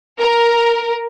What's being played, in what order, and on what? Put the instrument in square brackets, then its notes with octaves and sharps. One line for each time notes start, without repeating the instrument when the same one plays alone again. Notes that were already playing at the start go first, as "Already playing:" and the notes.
[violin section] A#4